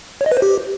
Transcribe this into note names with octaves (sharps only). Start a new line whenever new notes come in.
C#5
D#5
B4
C5
G4